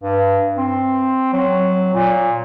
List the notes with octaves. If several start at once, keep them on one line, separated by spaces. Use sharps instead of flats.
G2
C4
F#3
A#2